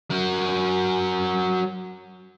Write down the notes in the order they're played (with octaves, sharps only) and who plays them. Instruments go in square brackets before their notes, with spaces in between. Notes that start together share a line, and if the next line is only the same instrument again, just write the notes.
[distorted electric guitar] F#3 A#4